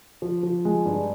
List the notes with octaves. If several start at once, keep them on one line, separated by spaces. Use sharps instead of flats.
F3
F3
G#3
G2